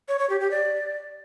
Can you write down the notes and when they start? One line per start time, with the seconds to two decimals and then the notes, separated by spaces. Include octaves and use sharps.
0.08 C#5
0.19 C#5
0.30 G4
0.40 G4
0.51 D5